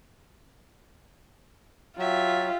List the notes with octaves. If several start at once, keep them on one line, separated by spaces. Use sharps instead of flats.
F#3 F4 G4 E5